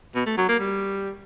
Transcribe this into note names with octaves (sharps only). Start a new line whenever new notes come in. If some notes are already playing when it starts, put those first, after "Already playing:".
B2
A3
F#3
A#3
G3